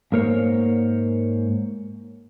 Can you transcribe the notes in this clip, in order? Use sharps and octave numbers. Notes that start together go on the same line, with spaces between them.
G#2 A#3 A#4 C5 C#5